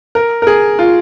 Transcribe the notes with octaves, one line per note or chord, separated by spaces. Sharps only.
A#4
A#4
G#4
F4